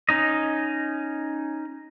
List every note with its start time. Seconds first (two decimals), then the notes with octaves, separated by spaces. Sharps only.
0.09 C#4 D#4 D#5